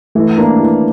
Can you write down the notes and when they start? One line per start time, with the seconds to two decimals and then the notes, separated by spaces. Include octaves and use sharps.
0.15 E3 A3
0.38 A#3 D4
0.60 E3